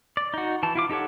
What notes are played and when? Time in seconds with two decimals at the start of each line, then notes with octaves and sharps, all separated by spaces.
0.17 D5
0.34 D#4 F#4
0.63 E3 A5
0.75 E4 F4 D6
0.90 D#4 G4 A4 C#5 F#5